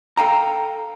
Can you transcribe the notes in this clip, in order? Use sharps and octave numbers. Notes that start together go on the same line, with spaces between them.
A4 F5 G5 A#5